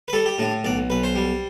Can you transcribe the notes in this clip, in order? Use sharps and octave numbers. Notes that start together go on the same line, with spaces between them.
B4
G3 A4
G4
A2 D4
B1 D5
B1 B4
C5
G3